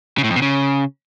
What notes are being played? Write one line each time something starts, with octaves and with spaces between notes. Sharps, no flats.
C#3
A2
F2
B2
C#3